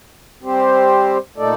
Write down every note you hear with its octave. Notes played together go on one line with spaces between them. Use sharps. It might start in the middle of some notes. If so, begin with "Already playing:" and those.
G3 C4 G4 C5
A#2 A3 D#4 A4 D5